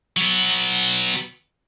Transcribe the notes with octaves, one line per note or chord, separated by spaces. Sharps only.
F#3 B3